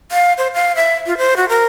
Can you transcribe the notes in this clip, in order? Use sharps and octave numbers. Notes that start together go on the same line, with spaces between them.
F5
C5
F5
E5
F4
C5
F#4
A#4